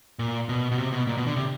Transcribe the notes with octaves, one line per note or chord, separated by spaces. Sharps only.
A#2
B2
B2
C3
B2
A#2
B2
D3
C3